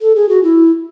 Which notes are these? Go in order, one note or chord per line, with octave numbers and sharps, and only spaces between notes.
A4
G#4
F#4
E4